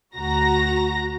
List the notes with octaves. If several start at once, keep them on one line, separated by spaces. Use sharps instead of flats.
D2 F#4 A#5 A#6